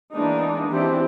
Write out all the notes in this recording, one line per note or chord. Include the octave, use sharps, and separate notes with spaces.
E3 G#3 A#3 B3 D4 D#4
E3 C4 D4 E4 G4